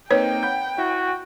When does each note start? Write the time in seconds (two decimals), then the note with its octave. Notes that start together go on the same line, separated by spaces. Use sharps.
0.11 A#3 C4 D#4 B4 C#5 G5
0.43 F#5 B5 G6
0.78 E4 F#4